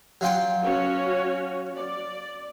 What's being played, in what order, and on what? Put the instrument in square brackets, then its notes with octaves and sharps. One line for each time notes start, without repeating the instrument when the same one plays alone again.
[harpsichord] F#3 F4 G5
[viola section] C#4 F#4 C#5
D5